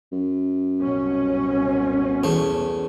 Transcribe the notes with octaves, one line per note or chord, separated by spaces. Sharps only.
F#2
C2 B2 C#4
E2 A3